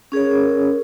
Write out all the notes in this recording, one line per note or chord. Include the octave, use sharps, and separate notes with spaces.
C#4 G#4 A#4 C#5